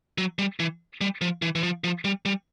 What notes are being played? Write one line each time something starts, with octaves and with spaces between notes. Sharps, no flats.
F#3
G3
E3
G3
F3
E3
E3
F3
F3
G3
G3